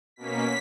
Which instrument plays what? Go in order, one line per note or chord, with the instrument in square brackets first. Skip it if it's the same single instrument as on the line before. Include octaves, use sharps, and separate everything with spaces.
[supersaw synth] B2 A#3 C#4 B6